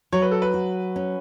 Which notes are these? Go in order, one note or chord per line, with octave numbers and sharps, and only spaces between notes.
F#3 C#5
B4
A4
B4
F#4
C#4